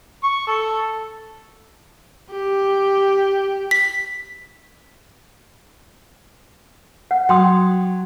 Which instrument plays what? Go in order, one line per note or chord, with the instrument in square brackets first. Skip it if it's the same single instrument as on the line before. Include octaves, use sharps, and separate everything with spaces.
[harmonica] C#6
A4
[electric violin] G4
[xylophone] B6
[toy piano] F#5
[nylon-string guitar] F#3 [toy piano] G5 C6 D#6